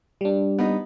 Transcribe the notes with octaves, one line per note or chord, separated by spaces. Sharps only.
G3 D4
B3 D#4